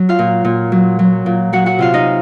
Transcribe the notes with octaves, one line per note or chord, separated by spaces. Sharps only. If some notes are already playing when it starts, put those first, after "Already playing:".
Already playing: F#3
F4 F5
A#2
A#2
F#3
F#3
A#2
F#3 F#4 F#5
F#4 F#5
C3 F4 F5
D#4 D#5